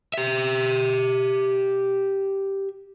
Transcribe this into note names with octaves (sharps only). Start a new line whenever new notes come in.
G4 E5